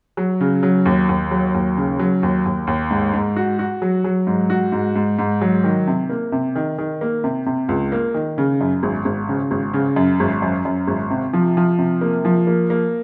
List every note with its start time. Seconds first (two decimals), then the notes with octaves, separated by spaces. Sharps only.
0.17 F#3
0.41 C#3
0.63 F#3
0.86 D#2
1.09 D#2
1.31 F#3
1.54 D#2
1.77 C#3
1.99 F#3
2.23 D#2
2.45 D#2
2.67 D#2
2.90 G#2
3.13 G#2
3.36 F#4
3.59 F#4
3.82 F#3
4.04 F#3
4.27 G#2
4.50 F#4
4.72 G#2
4.96 G#2
5.19 G#2
5.41 F#3
5.64 D#3
5.87 C3
6.10 A#3
6.32 C3
6.56 D#3
6.78 D#3
7.01 A#3
7.24 C3
7.46 C3
7.69 C#2
7.92 A#3
8.14 D#3
8.38 C#3
8.61 F#2
8.83 G#1
9.05 G#1
9.28 C#3
9.51 G#1
9.73 C#3
9.96 F#2
10.20 G#1
10.42 F#2
10.65 F#2
10.88 G#1
11.10 C3
11.33 F3
11.57 F3
11.79 C3
12.01 A#3
12.25 F3
12.47 A#3
12.70 A#3